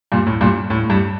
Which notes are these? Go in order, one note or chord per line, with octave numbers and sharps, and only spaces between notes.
G2 A#2
A2
G2 A#2
A2
G2